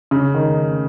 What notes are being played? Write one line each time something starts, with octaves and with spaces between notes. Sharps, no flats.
C#3
D#3